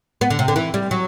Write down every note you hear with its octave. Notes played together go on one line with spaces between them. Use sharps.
B3
D3
C3
D3
E3
G3
F#3